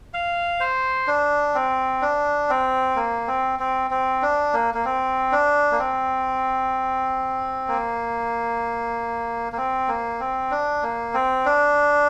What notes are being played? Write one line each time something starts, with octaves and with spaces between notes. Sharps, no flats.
F5
C5
D4
C4
D4
C4
A#3
C4
C4
C4
D4
A#3
A#3
C4
D4
A#3
C4
A#3
A#3
C4
A#3
C4
D4
A#3
C4
D4